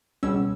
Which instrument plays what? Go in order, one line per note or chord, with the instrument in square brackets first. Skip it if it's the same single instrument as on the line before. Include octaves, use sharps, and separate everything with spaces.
[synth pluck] C#2 B2 G3 C#4 E6